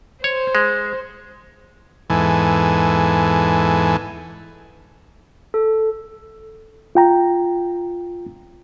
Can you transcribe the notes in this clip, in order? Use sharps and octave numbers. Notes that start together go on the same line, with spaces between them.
C5 C#5
G#3
E2 G#2 E3 A4 G#5
A4
F4 G5 A#5